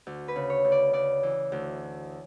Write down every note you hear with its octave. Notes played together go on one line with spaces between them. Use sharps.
D2
B4
C#3
C#5
D2
D5
C#3 D5
E3
D2